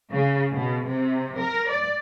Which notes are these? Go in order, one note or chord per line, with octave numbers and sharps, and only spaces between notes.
C#3
B2
C3
A#4
D5